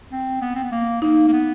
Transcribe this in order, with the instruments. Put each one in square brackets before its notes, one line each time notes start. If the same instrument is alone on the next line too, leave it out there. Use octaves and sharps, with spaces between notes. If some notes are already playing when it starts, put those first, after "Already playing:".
[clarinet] C4
B3
C4
B3
A#3
[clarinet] A#3 [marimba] D#4
[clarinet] A#3
B3